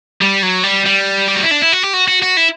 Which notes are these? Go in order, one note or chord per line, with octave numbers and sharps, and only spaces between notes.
G3
F#3
G3
G3
G4
F#4
E4
D4
E4
F#4
G4
F#4
F#4
F#4
E4